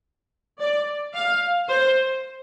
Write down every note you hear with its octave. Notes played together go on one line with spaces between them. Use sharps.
D5
F5
C5